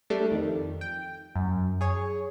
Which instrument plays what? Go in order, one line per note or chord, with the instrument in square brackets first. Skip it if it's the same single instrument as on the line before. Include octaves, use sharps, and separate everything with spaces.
[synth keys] G3 A3 D4 D5
F2 D#3
G5
F#2
G#4 C#5